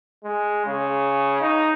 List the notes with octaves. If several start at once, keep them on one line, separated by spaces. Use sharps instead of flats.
G#3
C#3
D#4